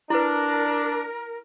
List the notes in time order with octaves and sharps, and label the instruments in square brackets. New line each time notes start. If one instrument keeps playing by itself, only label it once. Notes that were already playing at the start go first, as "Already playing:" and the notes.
[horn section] D4 [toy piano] E4 B4 [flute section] A#4